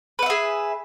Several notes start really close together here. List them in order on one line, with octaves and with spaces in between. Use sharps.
B4 F#5 E5 G#4